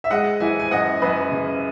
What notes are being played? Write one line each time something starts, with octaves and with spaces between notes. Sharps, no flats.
E5
G#3 D#5 F#5
E3 E5 G#5
G#5
F#2 D#5 F#5
F#2 B4 D#5
C#3